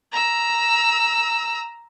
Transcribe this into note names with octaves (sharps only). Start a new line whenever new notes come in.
A#5 E6